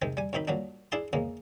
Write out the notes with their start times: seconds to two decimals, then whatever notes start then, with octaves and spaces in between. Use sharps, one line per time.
0.02 C3 D#3 G#3 C4
0.17 G3 G#5
0.33 F#2 D#3 C4 D#4 B5
0.48 A#2 F#3 G3 D4
0.92 D4 E4 G#4 A5 C6
1.13 E2 C#3 G#3 A#3